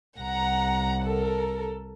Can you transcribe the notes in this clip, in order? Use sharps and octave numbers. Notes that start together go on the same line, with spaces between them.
C2 F#5 A#5
A4 A#4